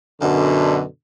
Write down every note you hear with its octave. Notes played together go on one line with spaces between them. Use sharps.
F#2 B2 D3